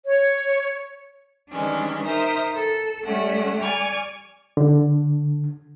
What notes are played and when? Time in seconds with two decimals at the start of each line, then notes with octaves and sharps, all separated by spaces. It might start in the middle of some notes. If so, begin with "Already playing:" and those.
0.06 C#5
1.49 D#3 E3 G3 G#3 C#4 D4
2.04 D#4 A#4 C5 E5 D#6
2.54 A4
3.04 G3 A3 C#4 F#5
3.61 D5 G#5 C#6 D6 F6
4.57 D3